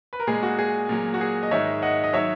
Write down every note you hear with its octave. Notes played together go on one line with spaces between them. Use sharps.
B4
A#4
A#2 G#3 G#4
F#4
G#4
A#2 F#3
F#4
G#4
D#5
G#2 D#3 G#3 C#5 E5
D#5 F#5
D#5
D#3 F#3 C#5 E5